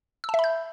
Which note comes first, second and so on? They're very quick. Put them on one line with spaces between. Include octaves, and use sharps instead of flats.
E6 A5 E5 B5 G6